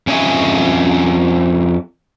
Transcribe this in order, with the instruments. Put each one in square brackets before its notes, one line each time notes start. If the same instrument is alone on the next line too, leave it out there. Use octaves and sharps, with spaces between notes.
[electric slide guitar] F2 C#4 C#5 D#5 E5 G#5